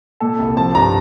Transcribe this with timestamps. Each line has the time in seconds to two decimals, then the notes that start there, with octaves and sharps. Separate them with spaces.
0.20 A#2 A4
0.39 C2
0.57 F3 A5
0.75 G2 A#5